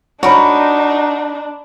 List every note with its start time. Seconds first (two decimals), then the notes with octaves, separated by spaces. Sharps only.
0.23 D4 D#4 F#4 A#4 C#5 B5